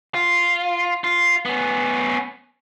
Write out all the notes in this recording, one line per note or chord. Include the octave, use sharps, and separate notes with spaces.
F4
F4
B3 C#4